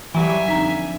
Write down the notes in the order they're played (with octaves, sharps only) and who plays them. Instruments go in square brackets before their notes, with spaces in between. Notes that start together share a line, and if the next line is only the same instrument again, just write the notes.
[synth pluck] E3 F#3 [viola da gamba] G3 [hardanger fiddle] E5 G#5
[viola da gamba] F2 D3 [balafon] D#4 A#5 [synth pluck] B6